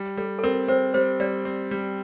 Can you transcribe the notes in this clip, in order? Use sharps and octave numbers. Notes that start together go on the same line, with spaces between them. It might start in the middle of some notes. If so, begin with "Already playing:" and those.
Already playing: G3
G3 A4
A4
C4 A#4
C4 C5
G3 C5
G3 D5
C4
G3